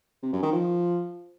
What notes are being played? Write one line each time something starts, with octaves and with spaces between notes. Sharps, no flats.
C3
F#2
D#3
F3